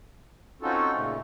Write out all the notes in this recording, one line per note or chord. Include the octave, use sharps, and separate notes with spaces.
C4 C#4 D#4 F4 F#4 A4
A#2 C#3 A3